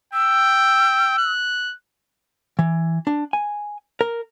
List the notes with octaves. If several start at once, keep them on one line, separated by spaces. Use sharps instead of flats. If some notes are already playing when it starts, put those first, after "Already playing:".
G5 E6
F#6
E3
D4
G#5
A#4